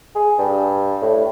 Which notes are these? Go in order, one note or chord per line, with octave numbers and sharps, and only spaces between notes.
G#4
G2
A2